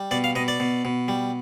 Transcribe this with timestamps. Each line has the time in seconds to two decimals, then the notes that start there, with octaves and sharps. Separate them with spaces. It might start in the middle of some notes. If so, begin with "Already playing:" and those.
Already playing: G3
0.11 B2 D5
0.24 F5
0.35 B2 D#5
0.48 D5
0.60 B2
0.85 B2
1.08 G3